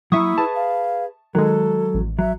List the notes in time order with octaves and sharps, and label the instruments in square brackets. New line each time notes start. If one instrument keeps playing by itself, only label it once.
[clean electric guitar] F#3 A3 A#3 [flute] E4 [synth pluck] E5 C#6 D#6
[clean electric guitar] G#4 B4 [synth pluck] A5
[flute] F5
[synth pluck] D#3 G#3 [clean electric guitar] F#3 [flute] A4
[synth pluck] A1
[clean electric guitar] F#3 [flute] E5